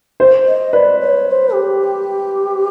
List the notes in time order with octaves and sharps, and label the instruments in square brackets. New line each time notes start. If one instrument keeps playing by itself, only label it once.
[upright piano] C5
[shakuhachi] D#5
[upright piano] B4 [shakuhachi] D5
[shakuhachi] C#5
C#5
C5
G4